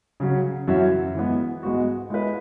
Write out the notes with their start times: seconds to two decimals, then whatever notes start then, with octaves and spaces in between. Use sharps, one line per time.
0.20 C#3 F#3 C#4
0.68 F#2 E3 C#4 F#4 E5
1.15 E3 G#3 B3
1.63 G#2 G#3 B3 F#4
2.10 G#3 E4 B4